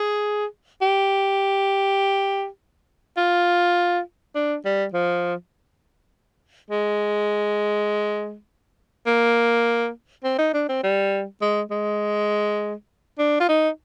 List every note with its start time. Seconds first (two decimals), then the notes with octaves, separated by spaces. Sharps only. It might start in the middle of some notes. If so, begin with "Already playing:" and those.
Already playing: G#4
0.81 G4
3.17 F4
4.35 D4
4.65 G3
4.93 F3
6.71 G#3
9.06 A#3
10.24 C4
10.38 D#4
10.53 D4
10.69 C4
10.83 G3
11.41 G#3
11.71 G#3
13.18 D4
13.40 F4
13.48 D#4